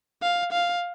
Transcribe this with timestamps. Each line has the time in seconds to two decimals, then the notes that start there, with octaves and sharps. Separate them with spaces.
0.22 F5
0.52 F5